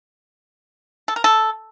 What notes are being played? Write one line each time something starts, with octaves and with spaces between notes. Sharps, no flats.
A4
A#4
A4